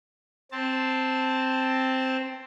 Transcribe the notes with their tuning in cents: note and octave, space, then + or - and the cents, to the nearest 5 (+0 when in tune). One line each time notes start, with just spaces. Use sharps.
C4 +0 A5 +0